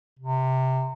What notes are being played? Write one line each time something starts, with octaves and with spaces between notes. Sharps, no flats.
C3